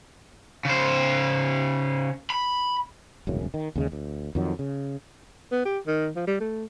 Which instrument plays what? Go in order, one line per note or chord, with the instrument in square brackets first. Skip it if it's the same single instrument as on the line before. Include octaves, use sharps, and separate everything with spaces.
[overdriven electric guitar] C#3 C5
B5
[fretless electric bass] E1 C2 F#2 C#3
D#3
D#2 C#3 G#3
D2
F2 D#3 F#3
C#3
[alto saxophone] B3
G4
D#3
F3
G3
A3